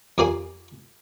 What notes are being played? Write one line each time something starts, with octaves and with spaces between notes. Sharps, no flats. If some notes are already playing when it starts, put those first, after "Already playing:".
F2 G4 A#4 D5 F5 G#5